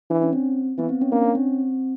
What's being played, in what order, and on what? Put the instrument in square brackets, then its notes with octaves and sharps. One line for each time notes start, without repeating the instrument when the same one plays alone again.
[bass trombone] E3 [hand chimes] D4
[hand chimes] C#4
C4
[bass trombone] E3 [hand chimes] B3
[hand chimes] C4
C#4
[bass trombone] A#3 [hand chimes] D4
[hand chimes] C#4
C4